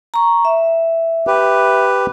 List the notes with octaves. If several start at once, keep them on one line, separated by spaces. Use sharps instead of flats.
A#5 C#6
E5
G4 B4